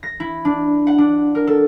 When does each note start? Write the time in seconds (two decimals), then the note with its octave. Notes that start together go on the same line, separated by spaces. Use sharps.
0.03 A#6
0.20 E4
0.45 D4
0.87 F#5
0.98 D4
1.35 A#4
1.47 A4